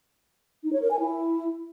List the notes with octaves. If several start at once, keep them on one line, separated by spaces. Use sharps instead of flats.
D#4
C#5
A#4
G#5
E4